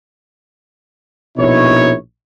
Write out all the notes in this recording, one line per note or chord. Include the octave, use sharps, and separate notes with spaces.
A#1 B2 D#4 E4 C#5